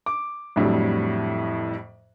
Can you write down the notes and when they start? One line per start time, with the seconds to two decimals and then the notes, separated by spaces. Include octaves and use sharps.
0.06 D6
0.56 F2 A2 D3 F#3 G3